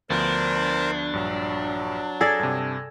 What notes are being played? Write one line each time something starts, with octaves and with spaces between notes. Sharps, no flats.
D2 F3 B3 D4 A#4 C5
A#1 G2 F#3
G#4 A4 D5 E6 G#6 A#6
G2 C3